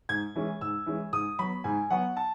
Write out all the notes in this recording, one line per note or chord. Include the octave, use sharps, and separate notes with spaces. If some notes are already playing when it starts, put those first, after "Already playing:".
G#2 G#6
E3 G#3 C#4
G#2 E6
E3 G#3 C#4
G#2 D#6
F#3 B3 B5
G#2 G#5
F#3 B3 F#5
A5